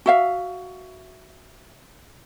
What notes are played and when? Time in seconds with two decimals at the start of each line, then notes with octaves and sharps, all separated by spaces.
0.06 F#4 E5 F5